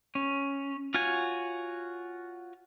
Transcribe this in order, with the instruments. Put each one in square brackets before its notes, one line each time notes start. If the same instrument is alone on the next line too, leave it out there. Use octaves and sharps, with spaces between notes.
[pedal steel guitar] C#4
F4 F#4 C#5 G#5